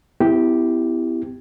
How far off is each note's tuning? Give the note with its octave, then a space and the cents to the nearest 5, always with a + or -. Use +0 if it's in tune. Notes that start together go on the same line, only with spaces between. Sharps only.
B3 +45 E4 +0 G4 +0